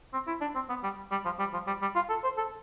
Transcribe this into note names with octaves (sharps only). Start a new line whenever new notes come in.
C4
E4
D4
C4
B3
G3
G3
F3
G3
F3
G3
G3
F4
A4
C5
A4